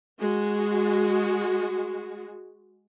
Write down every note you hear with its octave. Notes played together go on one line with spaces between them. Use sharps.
G#3 F#4